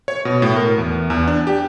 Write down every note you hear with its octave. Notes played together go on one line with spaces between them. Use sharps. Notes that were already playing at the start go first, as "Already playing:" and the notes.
C#5
B2
A2
A#4
E2
E2
D4
G4